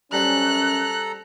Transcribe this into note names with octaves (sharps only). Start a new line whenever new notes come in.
F#2 G3 C#4 D4 A4 C5 A#5 F#6